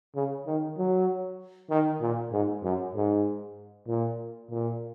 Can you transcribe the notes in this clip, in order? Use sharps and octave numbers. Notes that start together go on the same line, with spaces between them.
C#3
D#3
F#3
D#3
A#2
G#2
F#2
G#2
A#2
A#2